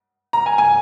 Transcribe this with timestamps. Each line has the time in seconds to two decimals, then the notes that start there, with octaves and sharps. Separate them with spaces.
0.33 A#5
0.46 G#5
0.58 G#5